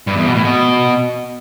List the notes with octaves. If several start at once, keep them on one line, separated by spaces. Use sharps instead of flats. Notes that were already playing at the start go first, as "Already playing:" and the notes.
G2
E2
B2
A2
B2